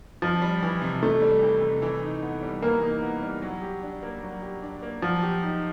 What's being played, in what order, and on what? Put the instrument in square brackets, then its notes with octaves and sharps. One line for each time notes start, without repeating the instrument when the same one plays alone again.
[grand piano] F2 [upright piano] F3
[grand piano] G3
E3
C3
[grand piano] F2 [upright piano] A3
[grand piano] G3
E3
C3
E3
D#4
B3
G3
[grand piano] E3 [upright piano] A#3
[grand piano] D#4
B3
G3
F#3
G4
D4
A#3
F#3
G4
D4
A#3
[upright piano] F3 [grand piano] F#3
[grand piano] G4
D#4